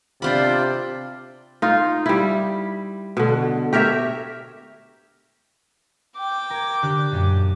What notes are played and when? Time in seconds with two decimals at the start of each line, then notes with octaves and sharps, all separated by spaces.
0.22 C3 D4 F4 C5 D5 B5
1.62 D#4 F4
2.06 G3 E4
3.17 B2 D3
3.73 G4 A#4 C#5 E5
6.17 G5 D6
6.50 A#4 G#6
6.82 D3 G4 F#6
7.12 F#2 A#2